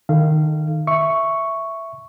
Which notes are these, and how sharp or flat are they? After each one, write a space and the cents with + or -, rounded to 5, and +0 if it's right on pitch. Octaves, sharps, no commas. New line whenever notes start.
D#3 -15 A4 +0 F5 -20
E5 +5 C#6 +0